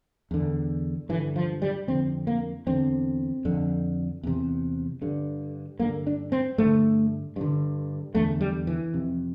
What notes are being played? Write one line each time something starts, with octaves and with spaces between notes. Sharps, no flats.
E2 D3
G2 D3 E3
F3
G3
F2 D3 C4
A#3
E2 D3 C4
F2 D3
E2 C3
G2 D3
G2 D3 A#3
D4
C4
G2 D3 A3
G2 D3
E2 D3 A3
G3
E3
F2 C3